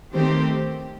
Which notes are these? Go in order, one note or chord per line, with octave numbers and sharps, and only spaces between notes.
D#3 A3 C4 G4 C5